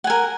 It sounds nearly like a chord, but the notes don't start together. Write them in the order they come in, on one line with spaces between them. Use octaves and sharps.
F#5 G#5 A#4